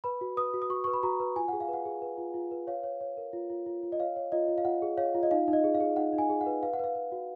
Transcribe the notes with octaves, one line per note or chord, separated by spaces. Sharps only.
B4 B5
F#4
B4 D#6
F#4
D#6
F#4 C#6
B4 C#6
B5
F#4 A#5
B4
F4 G#5
G#4 F#5
F5
B4 F#5
G#4
B4
F4
F4
B4
C#5 F5
C#5
C#5
A#4
F4
F4
F4
F4
D#5
C#5 F5
C#5
F4 D#5
F4
F5
F4 F#5
G#4
C#5 F5
F4
D#5
D#4 F5
D#4
D#5
G#4
F5
G#4
D#4 F#5
D#4
G#5
G#4
F#5
B4
B4 F5
F#5
B4 F5
B4
F#4